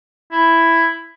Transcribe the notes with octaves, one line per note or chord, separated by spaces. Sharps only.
E4